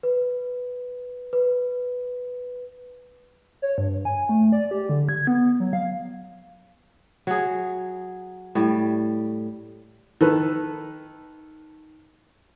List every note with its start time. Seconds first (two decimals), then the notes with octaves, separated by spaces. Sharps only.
0.03 B4
1.33 B4
3.62 C#5
3.78 G2
4.05 G#5
4.29 A3
4.52 D5
4.71 G4
4.89 D3
5.09 G#6
5.27 B3
5.60 F#3
5.73 F5
7.27 F#3 G#4
8.55 A2 G3
10.21 D#3 A4 B4